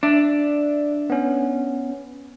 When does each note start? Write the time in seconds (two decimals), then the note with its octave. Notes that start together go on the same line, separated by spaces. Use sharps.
0.03 D4 D5 E5
1.10 B3 C#4